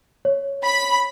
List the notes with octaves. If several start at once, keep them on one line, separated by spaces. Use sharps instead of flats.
C#5
B5